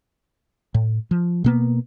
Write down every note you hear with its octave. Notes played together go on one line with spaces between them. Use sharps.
A2
F3
B2 A#3 B3